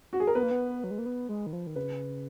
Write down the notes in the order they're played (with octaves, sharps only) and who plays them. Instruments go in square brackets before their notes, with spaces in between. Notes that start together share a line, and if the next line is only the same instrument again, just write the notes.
[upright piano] F#4
G#4
A#4
[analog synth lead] B3 [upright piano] B4
[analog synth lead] A#3
B3
F#3
G#3
A#3
B3
G#3
D#3
F3
D#3
[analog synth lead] C#3 [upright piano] B4